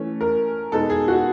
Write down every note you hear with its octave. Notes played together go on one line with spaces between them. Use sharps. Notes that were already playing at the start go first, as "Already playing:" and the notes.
Already playing: E3 A3 C#4
A#4
B2 G#3 B3 D#4 A4
G#4
F#4